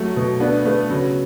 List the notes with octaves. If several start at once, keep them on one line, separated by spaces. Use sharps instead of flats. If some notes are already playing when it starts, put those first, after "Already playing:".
Already playing: F#3 A3
B2
B3 D4
A3 B3
C#3 F#3